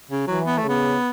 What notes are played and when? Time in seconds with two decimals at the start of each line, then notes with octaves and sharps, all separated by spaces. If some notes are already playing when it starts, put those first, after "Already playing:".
0.11 C#3
0.27 E3 F#3
0.45 B3
0.58 C#3 A3
0.69 B3